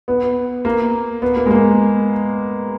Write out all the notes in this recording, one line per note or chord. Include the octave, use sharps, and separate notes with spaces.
B3
A#3
B3
A#3
G#3
A#3